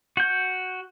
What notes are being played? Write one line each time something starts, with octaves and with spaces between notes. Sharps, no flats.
F#4 G6